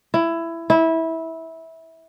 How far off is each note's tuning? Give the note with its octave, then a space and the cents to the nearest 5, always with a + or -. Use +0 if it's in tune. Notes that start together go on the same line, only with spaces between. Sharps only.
E4 +15
E4 -20